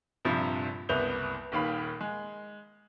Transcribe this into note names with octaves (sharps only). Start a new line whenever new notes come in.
A#1 G2 C3 F3
F#1 C2 B3 G6 F7 G7
D#1 D#2 F5 B5
G#3